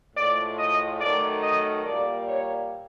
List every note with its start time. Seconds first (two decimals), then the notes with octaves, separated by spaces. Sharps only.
0.15 A2 F3 G#3 D5
0.58 D#5
1.00 D#3 F#3 A3 D5
1.43 D#5
1.85 A#2 G3 A#3 D5
2.28 C#5